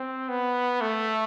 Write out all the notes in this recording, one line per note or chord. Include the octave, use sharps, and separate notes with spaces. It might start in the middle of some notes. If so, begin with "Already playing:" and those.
Already playing: C4
B3
A3